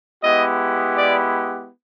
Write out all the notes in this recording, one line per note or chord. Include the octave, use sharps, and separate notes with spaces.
G#3 B3 E4 G4 D#5
D5